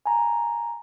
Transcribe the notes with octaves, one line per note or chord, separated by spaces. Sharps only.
G#5 A#5